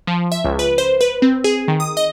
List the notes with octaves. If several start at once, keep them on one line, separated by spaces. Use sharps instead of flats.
F3
E5
C#2
B4
C5
B4
C4
G#4
D#3
D#6
D#5